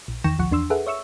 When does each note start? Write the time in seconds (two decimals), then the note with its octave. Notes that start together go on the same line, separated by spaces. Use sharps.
0.08 A#1
0.24 E2 D#3 G5 C#6 A#6 E7
0.39 A1 D2 F3 F#5 C#6
0.51 E2 D4 C6 E6
0.70 G#4 A4 B4 E5 F#5
0.86 C#5 E5 C#6 E6